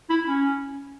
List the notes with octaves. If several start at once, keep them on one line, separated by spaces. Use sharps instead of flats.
E4
C#4